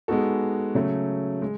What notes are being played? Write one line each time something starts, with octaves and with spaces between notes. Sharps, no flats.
G#3 B3 D#4 F#4 A4
C#3 F#3 A3
G#3